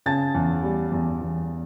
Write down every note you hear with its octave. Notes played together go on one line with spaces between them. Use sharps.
C#3 A5 A6
E2
G3
E2
E2